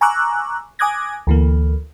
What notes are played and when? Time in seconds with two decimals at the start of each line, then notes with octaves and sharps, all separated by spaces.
0.01 G#5 A#5 C#6 D6 E6 F#6
0.79 G#5 D6 D#6 F#6 G#6 A#6
1.27 D2 E3 A#3